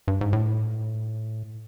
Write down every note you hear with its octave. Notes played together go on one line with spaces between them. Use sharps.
G2
G#2
A2